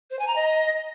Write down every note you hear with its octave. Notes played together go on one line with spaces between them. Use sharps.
C5
G#5
A#5
D#5